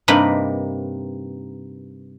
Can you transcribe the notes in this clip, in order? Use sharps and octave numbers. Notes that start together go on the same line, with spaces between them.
G2 C3 A#3 D#4 B4 B5